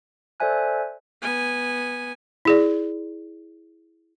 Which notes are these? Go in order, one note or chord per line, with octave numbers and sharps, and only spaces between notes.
A4 C5 D5 E5 G#5 F#6
B3 G#5
E4 G#4 D5